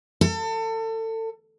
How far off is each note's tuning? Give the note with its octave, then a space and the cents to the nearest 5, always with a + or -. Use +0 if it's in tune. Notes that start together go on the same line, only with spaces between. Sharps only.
A4 +30